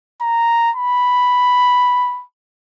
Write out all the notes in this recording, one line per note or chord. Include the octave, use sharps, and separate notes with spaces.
A#5
B5